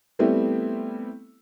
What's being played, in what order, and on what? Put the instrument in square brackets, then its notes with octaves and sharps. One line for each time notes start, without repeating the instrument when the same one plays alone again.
[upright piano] G3 A3 B3 C4 E4 G4